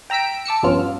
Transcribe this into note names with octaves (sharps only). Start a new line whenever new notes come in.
G5 A#5 E6 B6 D7
A5 D6 E6 C#7
A#1 G2 B3 C#4 F4 F6